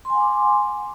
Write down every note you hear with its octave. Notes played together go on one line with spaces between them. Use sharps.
F#5 G#5 C6 D6